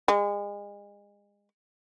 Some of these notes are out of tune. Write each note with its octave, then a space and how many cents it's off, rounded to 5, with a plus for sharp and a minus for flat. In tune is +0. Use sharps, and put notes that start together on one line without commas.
G#3 -35